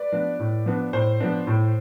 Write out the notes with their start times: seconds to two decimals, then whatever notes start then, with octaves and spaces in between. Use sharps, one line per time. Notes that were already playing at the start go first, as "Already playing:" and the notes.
Already playing: B4 D5
0.12 F3 B3 D4
0.39 A2
0.66 F3 B3 D4
0.93 A2 C5
1.20 F3 B3 D4
1.47 A2